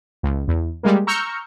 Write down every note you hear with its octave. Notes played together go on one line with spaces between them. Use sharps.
C#2
E2
G3 G#3 A#3
A#5 C#6 E6 F6 G6 C#7